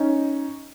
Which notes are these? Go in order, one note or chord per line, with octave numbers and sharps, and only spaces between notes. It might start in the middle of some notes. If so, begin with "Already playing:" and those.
Already playing: C#4 D#4